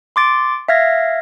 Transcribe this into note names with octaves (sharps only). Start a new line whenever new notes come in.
C6 D6 A6 D7
E5 F5 F6 G#6 A#6